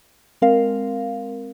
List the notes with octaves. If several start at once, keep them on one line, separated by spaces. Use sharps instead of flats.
G#3 C4 A#4 F5